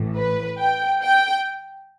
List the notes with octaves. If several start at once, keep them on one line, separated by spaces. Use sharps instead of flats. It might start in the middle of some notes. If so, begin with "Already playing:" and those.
Already playing: A1 A2 E3
B4
G5
G5